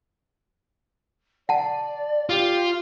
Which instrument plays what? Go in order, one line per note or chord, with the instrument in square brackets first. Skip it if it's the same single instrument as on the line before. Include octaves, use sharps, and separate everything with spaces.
[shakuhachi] D5 [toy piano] F#5 A5
[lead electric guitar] F4 [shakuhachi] G4